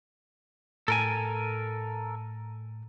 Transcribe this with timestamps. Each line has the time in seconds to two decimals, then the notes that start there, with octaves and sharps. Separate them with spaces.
0.88 A2 A4 A#4 G#5